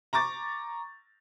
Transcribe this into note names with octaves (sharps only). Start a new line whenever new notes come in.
A#5 C#6 D6 A6